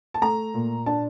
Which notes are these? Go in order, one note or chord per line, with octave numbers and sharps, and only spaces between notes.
A5
A3 A#5
A#2
D4 A5